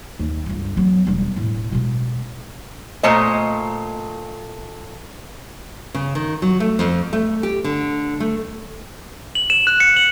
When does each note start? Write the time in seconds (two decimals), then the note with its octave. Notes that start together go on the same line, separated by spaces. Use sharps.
0.19 D#2
0.46 C#2 G2
0.77 F#3 B3
1.07 E1 G3
1.36 E1 A2
1.72 B2 G#3
3.03 A#2 A3 C5 D#5
5.94 C#3
6.15 D#3
6.42 F#3
6.60 A3
6.79 F2
7.13 A3
7.43 G4
7.64 D3
8.20 A3
9.35 F#7
9.50 E7
9.67 F#6
9.80 C#7
9.96 F#7